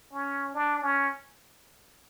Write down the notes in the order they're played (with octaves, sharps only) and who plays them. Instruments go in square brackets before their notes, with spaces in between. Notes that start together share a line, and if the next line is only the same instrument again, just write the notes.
[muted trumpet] C#4
D4
C#4